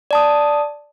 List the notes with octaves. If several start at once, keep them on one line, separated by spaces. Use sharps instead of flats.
D5 A5 D#6